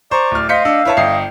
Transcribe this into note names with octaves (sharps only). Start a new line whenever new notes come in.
C5 D5 A#5 C#6
D1 F6
C5 D#5 F5 G6 B6 C#7
D4 E6
E4 B4 C#5 A5
G1 D#5 E5 G5 C7